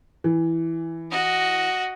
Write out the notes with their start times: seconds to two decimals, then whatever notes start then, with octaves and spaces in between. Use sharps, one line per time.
0.24 E3
1.11 F#4 D#5